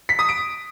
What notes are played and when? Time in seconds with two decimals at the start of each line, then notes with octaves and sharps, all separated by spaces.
0.09 B6
0.19 D#6
0.29 D7